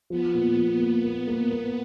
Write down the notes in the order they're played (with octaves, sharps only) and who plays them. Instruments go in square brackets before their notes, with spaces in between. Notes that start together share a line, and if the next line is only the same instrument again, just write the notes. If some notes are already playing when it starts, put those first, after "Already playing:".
[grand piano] F3 [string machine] B3
[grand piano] A#2
F3
A#3
A#3
A#3
A#3